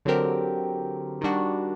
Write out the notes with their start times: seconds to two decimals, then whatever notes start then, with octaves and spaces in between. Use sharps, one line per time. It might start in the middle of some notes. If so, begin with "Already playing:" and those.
0.05 D3 F#3 C4 G4 A#4
1.21 D#3 G3 D4 F#4